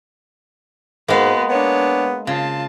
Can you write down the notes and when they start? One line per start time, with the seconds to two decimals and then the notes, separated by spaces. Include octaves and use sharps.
1.08 G#2 G#3 A#3 B3 F#4
1.49 B3 D4 C#5
2.27 C#3 F4 A5